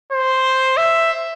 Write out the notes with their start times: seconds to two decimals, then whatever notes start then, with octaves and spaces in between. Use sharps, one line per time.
0.12 C5
0.77 E5